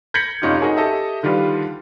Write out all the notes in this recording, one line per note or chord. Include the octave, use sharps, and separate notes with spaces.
G6 G#6 A#6 B6 C#7 F#7
F1 C#4 D#4 F4 G4
D#4 F#4 G#4 A#4 C#5
G4 A4 D#5 E5
D3 D#3 G3 F4 G4 B4